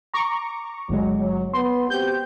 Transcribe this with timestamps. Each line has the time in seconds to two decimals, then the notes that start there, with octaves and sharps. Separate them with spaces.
0.14 A#5 C#6 D6
0.89 G1 F#3 G#3
1.21 F#3
1.53 B3 C6
1.90 C4 F#4 G4 G6